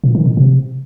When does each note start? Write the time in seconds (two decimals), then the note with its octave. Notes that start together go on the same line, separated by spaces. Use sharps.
0.04 A#2
0.15 D#3
0.26 A2
0.37 C3